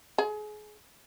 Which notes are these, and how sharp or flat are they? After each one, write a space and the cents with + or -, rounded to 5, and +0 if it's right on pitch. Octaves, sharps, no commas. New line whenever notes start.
G#4 +30